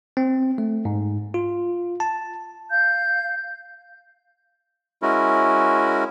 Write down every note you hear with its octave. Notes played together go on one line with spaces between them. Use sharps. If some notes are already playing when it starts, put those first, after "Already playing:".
C4
A3
G#2
F4
A5
F5 G6
G#3 C#4 E4 F#4 A#4